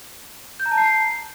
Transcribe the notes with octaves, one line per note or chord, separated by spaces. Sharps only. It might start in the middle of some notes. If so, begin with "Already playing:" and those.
G6
A#5
A5
C7